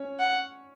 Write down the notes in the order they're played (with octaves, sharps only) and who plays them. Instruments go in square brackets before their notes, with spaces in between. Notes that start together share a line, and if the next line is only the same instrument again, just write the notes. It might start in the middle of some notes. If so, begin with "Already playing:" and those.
Already playing: [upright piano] C#4 C#5
[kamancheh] F#5